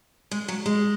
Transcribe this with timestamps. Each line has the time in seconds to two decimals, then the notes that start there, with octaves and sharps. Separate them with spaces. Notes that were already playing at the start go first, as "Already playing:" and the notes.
0.31 G#3
0.48 F#3
0.66 G#3